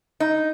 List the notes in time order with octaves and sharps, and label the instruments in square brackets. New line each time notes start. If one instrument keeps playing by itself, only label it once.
[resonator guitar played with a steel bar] D#4